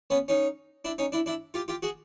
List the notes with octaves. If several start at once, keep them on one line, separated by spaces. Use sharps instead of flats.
B3 C#4
C#4 D#4
D4 E4
C#4 D#4
D4 E4
D4 E4
F4 G4
F4 G4
F#4 G#4